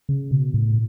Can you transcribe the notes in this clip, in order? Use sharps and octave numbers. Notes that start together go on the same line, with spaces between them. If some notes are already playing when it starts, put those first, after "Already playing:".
C#3
B2
A2